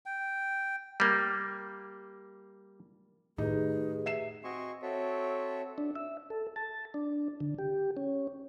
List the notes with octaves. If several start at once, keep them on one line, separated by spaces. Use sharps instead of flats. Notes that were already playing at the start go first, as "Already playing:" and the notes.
G5
G3 A#3
A2 D#3 D#4 G4 G#4 B4
E5 C7 E7
C4 F#4 D#5 G#5 C6 C#6
C4 F#4 A4 C#5 E5
D4
E5
A4
A5
D4
D3
G4
C#4